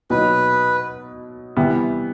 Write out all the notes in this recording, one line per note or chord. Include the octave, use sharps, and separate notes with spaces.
B2 F#3 B3 D#4 B4
C3 E3 G3 B3